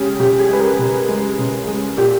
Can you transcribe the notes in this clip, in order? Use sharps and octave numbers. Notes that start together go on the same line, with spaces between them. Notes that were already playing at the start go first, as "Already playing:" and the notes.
Already playing: C#3 G#3 G4
C#3 G4
G#4
G#3 B4
A#4
C#3
G#3
C#3
G#3
A#2 G4